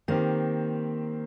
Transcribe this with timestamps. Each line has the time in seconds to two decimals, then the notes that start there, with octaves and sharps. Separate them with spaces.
0.08 D#3 A#3 C4 G4